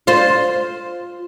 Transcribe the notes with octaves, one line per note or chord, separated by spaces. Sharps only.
F4 C5